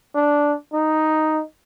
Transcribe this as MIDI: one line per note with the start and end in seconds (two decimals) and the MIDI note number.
0.15 0.54 62
0.73 1.41 63